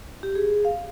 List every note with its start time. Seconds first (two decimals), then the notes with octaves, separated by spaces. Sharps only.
0.23 G4
0.35 G#4
0.65 F5